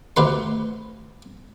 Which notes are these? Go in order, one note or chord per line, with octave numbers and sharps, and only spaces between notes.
D2 C3 B4 C6